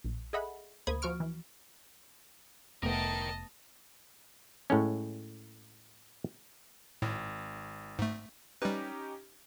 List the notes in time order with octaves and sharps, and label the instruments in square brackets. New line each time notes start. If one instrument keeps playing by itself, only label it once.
[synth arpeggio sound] A#1
G#4 A4 D#5 E5 F#5 B5
D2 A#3 C5 B5 D#6 G#6
F3 F#4 C#6 F6 D7
E3
[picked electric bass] F1 [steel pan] A3 B3 [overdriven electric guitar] A#4 G5 [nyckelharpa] D#5 A5
[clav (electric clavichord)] A2 G#3 C#4
[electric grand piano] G#1 [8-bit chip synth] A2
[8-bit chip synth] G#2 A3
[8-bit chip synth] G3 B4 [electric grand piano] C#4 D#4 G4